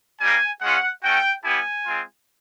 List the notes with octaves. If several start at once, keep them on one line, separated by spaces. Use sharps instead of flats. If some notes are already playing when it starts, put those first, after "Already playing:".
G3 A#3 D#4 G4 G#5
G#3 C#4 F4 F#5
A3 C#4 F#4 G5
G3 B3 E4 G4 G#5
G#3 C4 F4